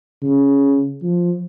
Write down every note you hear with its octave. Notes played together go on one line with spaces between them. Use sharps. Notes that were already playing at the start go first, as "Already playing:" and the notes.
C#3
F3